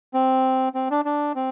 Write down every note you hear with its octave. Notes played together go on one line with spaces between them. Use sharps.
C4
C4
D4
D4
C4